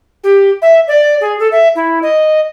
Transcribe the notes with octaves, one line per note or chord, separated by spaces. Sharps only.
G4
E5
D5
G#4
A4
E5
E4
D#5